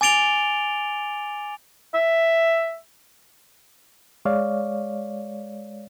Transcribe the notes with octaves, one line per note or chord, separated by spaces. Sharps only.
G#5 D6 A6 D7 F7 G7
E5
G#3 C#5 D5 F5